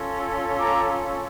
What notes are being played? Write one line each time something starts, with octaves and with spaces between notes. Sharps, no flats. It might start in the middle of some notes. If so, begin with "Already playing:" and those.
Already playing: C#4 F4 A4 C#5
A#5 D6
C#6